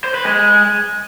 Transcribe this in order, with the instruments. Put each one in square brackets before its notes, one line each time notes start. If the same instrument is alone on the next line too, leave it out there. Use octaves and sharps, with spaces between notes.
[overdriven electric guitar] C5
B4
G#3